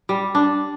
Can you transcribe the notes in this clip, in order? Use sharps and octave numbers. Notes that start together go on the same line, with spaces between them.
G3
D4